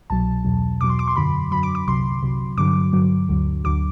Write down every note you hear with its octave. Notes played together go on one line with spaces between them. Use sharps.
C2 B2 F#3 A5
E2 B2 F#3
E2 B2 F#3 D6
C6
D6
C6
F#2 D3 F#3 B5
F#2 D3 F#3 B5
D6
D6
C2 C3 F#3 C6
C2 C3 F#3
G2 D3 F#3 D6
G2 D3 F#3
D2 D3 F#3
D2 D3 F#3 D6